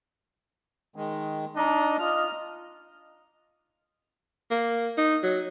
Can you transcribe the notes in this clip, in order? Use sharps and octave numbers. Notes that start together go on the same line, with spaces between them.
D#3 G#3
D4 D#4 D#5 A#5
F4 D#5 F6
A#3
D#4
F#3